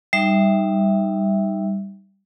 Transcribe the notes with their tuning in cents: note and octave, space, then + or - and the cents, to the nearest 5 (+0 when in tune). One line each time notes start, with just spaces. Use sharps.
G3 +0 D#4 +0 E5 +0